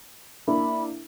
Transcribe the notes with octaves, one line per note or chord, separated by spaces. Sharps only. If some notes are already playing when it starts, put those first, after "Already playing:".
A#3 D4 E4 B5